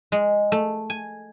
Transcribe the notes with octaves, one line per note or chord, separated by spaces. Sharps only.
G#3
A3
G#5